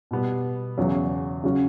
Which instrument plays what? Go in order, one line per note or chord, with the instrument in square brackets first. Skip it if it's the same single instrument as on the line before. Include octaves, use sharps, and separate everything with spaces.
[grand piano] B2 G3 B3
E2 C#3 F#3 C#4
C#3 F#3 C#4 F#4